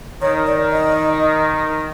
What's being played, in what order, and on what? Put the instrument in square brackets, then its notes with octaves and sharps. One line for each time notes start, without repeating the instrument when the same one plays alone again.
[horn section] D#3 [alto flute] C#5
[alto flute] D5
D#5